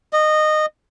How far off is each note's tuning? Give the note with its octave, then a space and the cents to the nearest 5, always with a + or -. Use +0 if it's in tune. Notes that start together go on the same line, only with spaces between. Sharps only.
D#5 -20